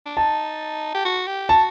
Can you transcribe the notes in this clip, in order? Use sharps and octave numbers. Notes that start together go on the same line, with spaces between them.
D4
D#4 A5
G4
F#4
G4
F#4 A5